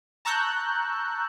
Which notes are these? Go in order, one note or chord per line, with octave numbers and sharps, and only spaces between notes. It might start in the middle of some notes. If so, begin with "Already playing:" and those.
A5 A#5 C#6 E6 F#6 G6